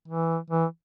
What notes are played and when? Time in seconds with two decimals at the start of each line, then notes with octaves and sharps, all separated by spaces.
0.08 E3
0.50 E3